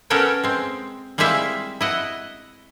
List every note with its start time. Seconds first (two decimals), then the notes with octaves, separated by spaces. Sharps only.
0.10 B3 C#4 A4 A#4 C#5 G5
0.44 G#3 C4
1.18 G3 G#3 C4 E4 E5 F5
1.81 E4 D#5 F#5